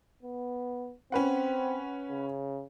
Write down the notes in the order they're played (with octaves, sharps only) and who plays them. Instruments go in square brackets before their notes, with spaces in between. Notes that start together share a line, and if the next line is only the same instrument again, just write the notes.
[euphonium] B3
[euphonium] C4 [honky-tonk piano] C#4 B4 F#5
[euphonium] C#3